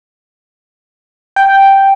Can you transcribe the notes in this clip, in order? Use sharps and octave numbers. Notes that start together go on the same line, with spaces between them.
G5